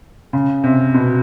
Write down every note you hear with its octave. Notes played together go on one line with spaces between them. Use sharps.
C#3
C3
B2